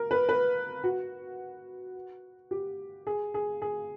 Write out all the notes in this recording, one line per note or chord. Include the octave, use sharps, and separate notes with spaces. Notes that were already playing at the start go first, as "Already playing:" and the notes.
Already playing: A#4
B4
B4
F#4
G4
G#4
G#4
G#4